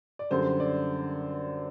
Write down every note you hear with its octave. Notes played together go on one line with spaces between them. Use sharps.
D5
F#2 D3 G3 C5
D5